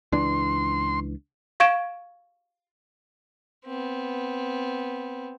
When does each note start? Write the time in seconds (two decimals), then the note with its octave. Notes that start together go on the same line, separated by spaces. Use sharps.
0.12 C#2 E3 D4 C6
1.60 F5 C#6 G#6 D7 E7
3.66 B3 C4